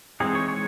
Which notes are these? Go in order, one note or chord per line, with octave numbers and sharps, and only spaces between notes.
E3 G#3 C4 D#4 G#4
C#5
C#5